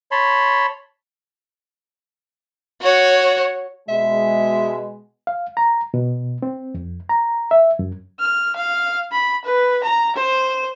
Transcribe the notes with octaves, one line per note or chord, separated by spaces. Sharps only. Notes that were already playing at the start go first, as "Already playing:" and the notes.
C#5 A5 B5 C6
F#4 C#5
B2 G#3 E5
F5
A#5
B2
C4
F2
A#5
E5
F#2
F6
F5
B5
B4
A#5
C5